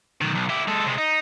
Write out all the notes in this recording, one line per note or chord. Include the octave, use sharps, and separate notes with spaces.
B1 D#3
B1
E4 G4
G#3 A4
C3 G#3
D#4